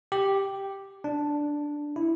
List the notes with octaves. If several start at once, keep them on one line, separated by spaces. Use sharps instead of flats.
G4
D4
E4